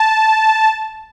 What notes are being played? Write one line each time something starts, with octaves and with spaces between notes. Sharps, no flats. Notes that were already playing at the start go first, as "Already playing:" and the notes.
Already playing: A5